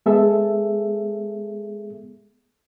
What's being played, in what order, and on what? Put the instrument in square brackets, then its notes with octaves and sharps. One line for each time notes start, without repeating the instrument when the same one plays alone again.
[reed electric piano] G#3 B3 G#4 A4 E5